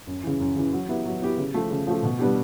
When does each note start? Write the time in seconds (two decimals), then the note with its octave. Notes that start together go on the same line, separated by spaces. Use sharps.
0.07 F#2
0.24 C#3 E3
0.40 F#2
0.56 C#3 E3
0.72 F#3
0.89 B3 E4 G4
1.06 F#3
1.22 B3 E4 G4
1.37 C#3
1.54 F3 A3
1.70 C#3
1.87 F3 A3
2.03 B2
2.19 G3 B3 D4 G4